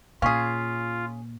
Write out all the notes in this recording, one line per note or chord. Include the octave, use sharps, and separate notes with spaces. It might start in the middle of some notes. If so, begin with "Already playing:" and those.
A#2 C#4 F4 G#4 F5 C#6 B6